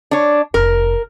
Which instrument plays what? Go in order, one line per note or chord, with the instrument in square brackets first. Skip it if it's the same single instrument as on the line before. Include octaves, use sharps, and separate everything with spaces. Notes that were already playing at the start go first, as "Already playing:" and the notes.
[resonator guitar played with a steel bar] D4 C#5
[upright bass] F1 [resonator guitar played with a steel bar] A#4